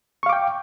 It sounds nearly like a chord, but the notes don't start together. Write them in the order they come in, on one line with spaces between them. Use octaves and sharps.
C#6 F5 D6 G5